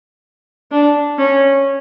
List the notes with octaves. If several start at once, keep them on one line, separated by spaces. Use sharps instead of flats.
D4
C#4